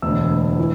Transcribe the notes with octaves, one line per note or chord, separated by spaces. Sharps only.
E1 D2 D3 E6
E3